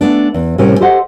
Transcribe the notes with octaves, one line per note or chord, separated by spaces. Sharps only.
A3 B3 D4
E2
A2 C3 G3 C#4 A#4 G#5
G4 A4 C5 D#5 F#5